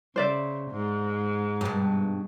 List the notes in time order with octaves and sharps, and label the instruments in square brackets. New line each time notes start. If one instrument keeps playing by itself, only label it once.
[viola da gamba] C#3 [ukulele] C5 D5 E5
[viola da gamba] G#2
[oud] G2 B2